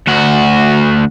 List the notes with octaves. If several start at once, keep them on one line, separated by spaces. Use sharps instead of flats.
D2 F#4